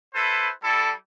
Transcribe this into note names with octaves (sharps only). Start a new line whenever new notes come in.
E4 A4 B4 C5
G3 E4 A4